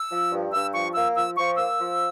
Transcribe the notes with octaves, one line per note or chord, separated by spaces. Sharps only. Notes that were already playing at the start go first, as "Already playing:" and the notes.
Already playing: E6
F3
G2
G2 E6
F3 C#6
A#3 E6
F3 E6
F3 C#6
A#3 E6
F3